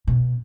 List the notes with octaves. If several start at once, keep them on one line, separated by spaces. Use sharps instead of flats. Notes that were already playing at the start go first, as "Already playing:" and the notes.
B2